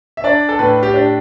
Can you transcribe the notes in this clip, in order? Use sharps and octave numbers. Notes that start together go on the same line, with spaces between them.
E5
D4 D5
A4
A2 B4
G4
D4